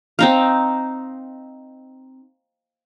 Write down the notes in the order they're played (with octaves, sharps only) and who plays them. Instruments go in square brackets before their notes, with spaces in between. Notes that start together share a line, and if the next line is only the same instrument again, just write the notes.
[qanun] C4 D#4 F5